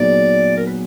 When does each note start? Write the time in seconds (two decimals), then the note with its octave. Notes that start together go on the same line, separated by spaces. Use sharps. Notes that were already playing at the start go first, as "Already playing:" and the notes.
Already playing: A#2 F#3 B3 D#4 G#4 D5
0.57 A#4
0.66 B4